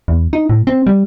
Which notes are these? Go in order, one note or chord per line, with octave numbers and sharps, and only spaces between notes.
E2
D#4
A2
C4
G3